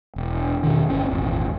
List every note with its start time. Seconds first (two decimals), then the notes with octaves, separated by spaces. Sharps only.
0.16 E1
0.63 E2 B2 D#3
0.89 G1 C#4
1.11 D#1 G#1 E2